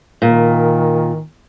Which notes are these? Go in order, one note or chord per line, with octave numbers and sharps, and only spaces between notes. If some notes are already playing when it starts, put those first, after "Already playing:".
A#2 D#3